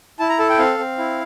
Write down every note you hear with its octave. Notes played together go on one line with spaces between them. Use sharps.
E4 A5
A#5
A4 A5
G5
C4 F5
C4
E4